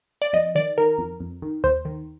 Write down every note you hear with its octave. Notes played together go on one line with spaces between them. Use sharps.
D5
F2 D#5
D#3 D5
D#3 A#4
F2
F2
D#3
D#2 C5
D#3